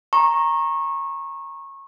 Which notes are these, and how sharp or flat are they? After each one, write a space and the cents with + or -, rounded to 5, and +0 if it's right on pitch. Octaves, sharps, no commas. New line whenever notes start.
A#5 +0 C#6 -25